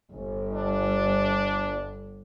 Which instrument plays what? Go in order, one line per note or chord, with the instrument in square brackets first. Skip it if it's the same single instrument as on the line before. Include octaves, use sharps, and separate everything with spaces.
[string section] G1
[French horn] D4